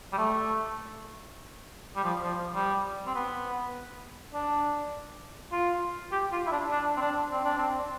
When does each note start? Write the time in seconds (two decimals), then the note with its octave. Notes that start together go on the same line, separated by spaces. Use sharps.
0.13 G3
0.17 A3
1.95 G3
2.04 F3
2.23 F3
2.55 G3
3.07 C4
3.15 B3
4.34 D4
5.52 F4
6.12 G4
6.32 F4
6.46 E4
6.52 D4
6.71 D4
6.96 C4
7.01 D4
7.30 C4
7.45 D4
7.57 C4